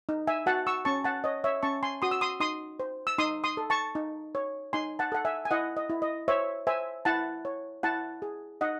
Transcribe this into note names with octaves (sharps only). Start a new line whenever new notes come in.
D#4
E5 G#5
F#4 F#5 A5
C#6 E6
C#4 A5 C#6
F#5 A5
C#5 D#5
C#5 E5
C#4 A5 C#6
G#5 C6
F#4 C6 D#6
E6
C6 D#6
D#4 C6 D#6
C5
E6
D#4 C6 D#6
C6 D#6
A4
A5 C#6
D#4
C#5
D#4 G#5 C6
F#5 A5
A4 F#5
E5 G#5
G#5
E4 D#5 F#5
D#5
E4
D#5
C5 C#5 E5
C5 E5 G#5
E4 F#5 A5
C#5
E4 F#5 A5
G#4
D#4 D#5 F#5